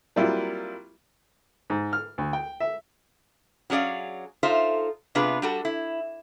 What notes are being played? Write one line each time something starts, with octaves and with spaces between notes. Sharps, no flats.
F#3 G3 A#3 C4 E4 F4
G#2
F6
D2
G5
E5
F#3 C#4 G#4 D5 F5
D#4 F4 A4 C5 E5
C3 B3 D4 F4 G#4 B4
G3 F#4 A4
E4